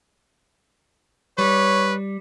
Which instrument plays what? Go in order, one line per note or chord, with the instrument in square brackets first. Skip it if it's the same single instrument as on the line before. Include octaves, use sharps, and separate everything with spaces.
[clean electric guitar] G3 [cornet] B4 [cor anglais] C#5